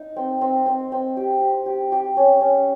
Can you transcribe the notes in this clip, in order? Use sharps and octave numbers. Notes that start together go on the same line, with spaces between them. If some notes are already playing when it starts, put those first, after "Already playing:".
Already playing: D#4
C4
C4
C4
C4
G4
G4
G4
G4
C#4
C#4